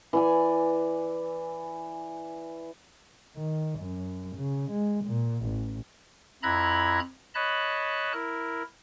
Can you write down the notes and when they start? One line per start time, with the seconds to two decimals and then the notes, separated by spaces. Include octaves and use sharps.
0.13 E3 D5 G#5
3.37 D#3
3.79 F#2
4.36 C#3
4.71 G#3
5.05 A#2
5.45 A1
6.43 F2 E4 A#5 B5 F#6 G#6
7.35 C#5 D#5 A5 B5 F#6
8.12 E4 A#4